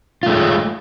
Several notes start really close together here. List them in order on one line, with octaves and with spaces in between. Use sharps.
F4 A3 G#3